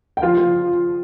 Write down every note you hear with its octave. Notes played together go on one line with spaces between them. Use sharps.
G5
F3 F4 F5
F3